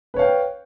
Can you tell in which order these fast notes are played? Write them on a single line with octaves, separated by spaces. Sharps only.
B4 C#5 F5 G5